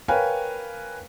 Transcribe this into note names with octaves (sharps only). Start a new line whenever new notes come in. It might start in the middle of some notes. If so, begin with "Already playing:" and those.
A#4 B4 C#5 F5 G5 G#5